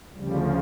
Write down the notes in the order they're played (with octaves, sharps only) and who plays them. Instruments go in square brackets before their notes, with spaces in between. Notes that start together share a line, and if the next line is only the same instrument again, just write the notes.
[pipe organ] D2 C#3 F3 G3